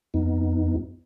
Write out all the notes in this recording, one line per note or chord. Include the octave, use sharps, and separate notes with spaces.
F2 B3 D#4